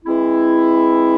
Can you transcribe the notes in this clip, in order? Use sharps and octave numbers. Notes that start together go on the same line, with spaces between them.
E3 G#3 C4 E4